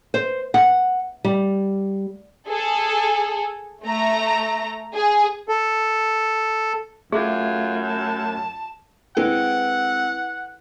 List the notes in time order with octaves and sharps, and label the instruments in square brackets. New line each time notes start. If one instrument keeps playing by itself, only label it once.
[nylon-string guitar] C5
F#5
G3
[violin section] G#4 A4
A3 A#5
G#4
[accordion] A4
[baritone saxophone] F#2 [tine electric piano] A3 G#6 [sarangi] F4 [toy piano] G#4
[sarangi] A5
[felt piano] G#3 C4 [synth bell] E4 A4 B4 [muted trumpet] F#5